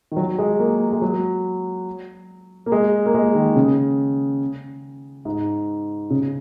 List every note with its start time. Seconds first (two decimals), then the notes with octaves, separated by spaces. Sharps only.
0.12 D#3
0.17 F#3
0.39 G#3
0.59 A#3
0.92 G#3
1.02 F#3
2.66 A#3
2.72 G#3
3.06 A#3
3.14 G#3
3.35 D#3
3.56 C#3
5.25 G#2
6.10 C#3